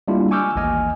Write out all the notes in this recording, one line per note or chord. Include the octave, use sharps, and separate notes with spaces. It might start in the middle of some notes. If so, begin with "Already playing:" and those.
G3 G#3 A#3 D4 E4 F4
G#5 C#6 D6 E6 F6 G6
A1 D#2 D#5 G#5 F6